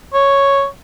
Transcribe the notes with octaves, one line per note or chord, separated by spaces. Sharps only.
C#5